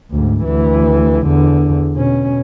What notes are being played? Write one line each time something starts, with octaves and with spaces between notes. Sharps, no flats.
D2 G#2
D2 E3
E2 D3
B2 C#4